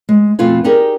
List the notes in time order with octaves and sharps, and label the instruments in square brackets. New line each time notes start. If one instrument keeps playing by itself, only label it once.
[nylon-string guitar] G#3
F2 B2 A3 F4 B4 G#5
D#4 G4 G#4 A#4 D5